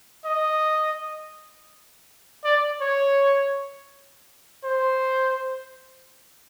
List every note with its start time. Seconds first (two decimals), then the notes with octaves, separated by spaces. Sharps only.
0.25 D#5
2.44 D5
2.81 C#5
4.64 C5